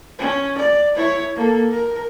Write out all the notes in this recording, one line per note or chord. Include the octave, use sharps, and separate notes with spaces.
C#4
D5
E4 C#5
A#3 A4
A#4